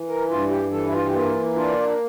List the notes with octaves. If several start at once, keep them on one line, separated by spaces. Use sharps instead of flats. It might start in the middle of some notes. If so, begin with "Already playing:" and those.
Already playing: E3
A#4
G2 F4
G4
E3 A4
E4
F4
G4
A#3 F4
D4 F4